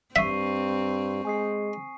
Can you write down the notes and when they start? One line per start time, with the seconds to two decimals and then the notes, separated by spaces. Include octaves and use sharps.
0.16 G2 C4 E5 C#6 C7 D#7
1.25 G#3 G#5 D#6 C7